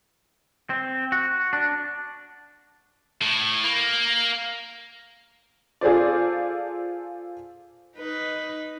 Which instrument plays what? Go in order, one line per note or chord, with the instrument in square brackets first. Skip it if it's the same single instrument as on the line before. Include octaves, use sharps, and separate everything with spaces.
[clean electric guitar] C4
F#4
D4
[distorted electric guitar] A2
A#3
[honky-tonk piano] F4 G#4 A4 C5 D5
[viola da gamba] D#4 B4